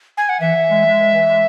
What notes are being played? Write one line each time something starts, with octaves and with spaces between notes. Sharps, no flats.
G#5
F#5
E3 E5
E3
G#3
G#3
E3
E3
G#3